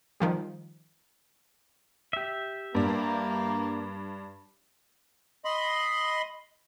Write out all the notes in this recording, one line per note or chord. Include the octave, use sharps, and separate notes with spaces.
D#3 F3 G3
G4 E5
G2 A#3 D4
D#5 B5 C6